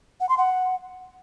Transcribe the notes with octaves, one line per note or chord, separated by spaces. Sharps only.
F#5
C6
F#5